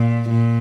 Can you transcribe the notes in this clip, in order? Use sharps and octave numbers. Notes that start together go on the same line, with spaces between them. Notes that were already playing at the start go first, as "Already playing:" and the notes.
Already playing: A#2
A#2